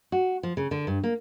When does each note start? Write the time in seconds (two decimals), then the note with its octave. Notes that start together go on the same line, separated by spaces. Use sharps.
0.12 F#4
0.43 F3
0.57 C#3
0.71 D3
0.87 G2
1.04 A#3